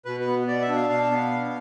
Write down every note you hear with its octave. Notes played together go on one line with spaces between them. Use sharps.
B2 B4
B4
B3
B2 D5
E5
D4
F5
B2 F5
B3
B2